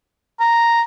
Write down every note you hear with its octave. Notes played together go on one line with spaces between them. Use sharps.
A#5